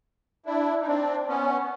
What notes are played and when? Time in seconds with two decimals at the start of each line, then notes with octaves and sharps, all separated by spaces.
0.46 D4 E4
0.81 D#4
0.87 C4 D4
1.28 B3 C#4